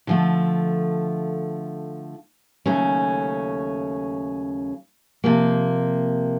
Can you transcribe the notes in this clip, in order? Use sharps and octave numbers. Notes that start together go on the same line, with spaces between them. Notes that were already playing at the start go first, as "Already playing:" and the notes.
D3 F3 A3
D#2 C#3 F#3 A3 C#4
C3 F3 A#3